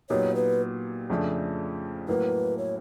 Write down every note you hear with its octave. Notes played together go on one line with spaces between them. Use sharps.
A#2 F#3 B3 D#4 G4 C#5
B4
F2 C#3 F3 A3 D4
A2 F#3 A#3 B4
C#5